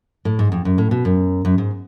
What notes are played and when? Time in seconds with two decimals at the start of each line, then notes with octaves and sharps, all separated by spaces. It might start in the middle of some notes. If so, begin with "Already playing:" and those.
0.25 A2
0.39 G#2
0.52 F2
0.65 F#2
0.78 A2
0.91 B2
1.05 F#2
1.45 F#2
1.58 G#2